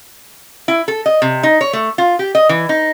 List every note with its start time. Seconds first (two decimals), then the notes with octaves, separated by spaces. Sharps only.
0.68 E4
0.88 A4
1.06 D#5
1.22 C3
1.43 D#4
1.61 C#5
1.73 A3
1.98 F4
2.19 G4
2.35 D#5
2.49 E3
2.69 D#4